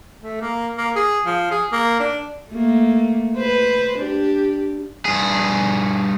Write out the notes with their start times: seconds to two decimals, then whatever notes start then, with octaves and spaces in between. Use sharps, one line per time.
0.20 A3
0.41 A#3
0.78 A#3
0.95 G#4
1.26 F3
1.51 G#4
1.72 A#3
1.99 D4
2.50 A3 A#3
3.36 B4 C5
3.98 D4 G4
5.05 G2 G#4